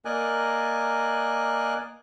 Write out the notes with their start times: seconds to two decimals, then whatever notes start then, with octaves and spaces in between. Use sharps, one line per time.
0.05 A#3 A#4 D5 D#5 G#5 F#6